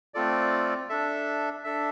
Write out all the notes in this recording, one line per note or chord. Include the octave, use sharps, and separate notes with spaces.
A3 C4 F4 A4 D5
D4 A4 E5
D4 A4 E5